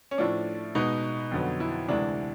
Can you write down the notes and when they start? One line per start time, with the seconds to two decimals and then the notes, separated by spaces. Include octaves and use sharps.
0.11 C#4
0.18 A2 F3 A3 D4
0.75 B2 G#3 B3 D#4
1.31 F2 D3 F#3 B3
1.60 E4
1.88 D2 C3 E3 G#3 D4